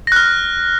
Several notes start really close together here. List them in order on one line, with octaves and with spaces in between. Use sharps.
A#6 F#6 F6